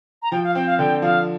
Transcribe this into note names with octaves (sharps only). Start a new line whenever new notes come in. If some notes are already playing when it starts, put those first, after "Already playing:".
A#5
F3 G5
F5
C4 G5
F5
D3 G5
F3 F5